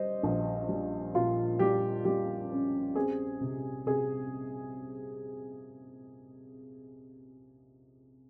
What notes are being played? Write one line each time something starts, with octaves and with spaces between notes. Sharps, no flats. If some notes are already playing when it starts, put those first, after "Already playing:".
Already playing: G3 C5 D#5
A#1
G3
A#2 F4
G3 G4
G3 G4
C#4
C4 G#4
C3
C3 G#4